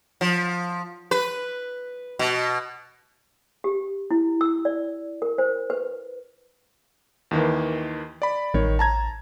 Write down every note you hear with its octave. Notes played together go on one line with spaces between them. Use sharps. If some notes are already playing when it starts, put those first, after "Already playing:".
F3
B4
B2
G4
E4
E6
D5
A#4
C5
B4
D#2 D#3 E3
D5 B5
A1 D#3 C#5
A5 A#5 G#6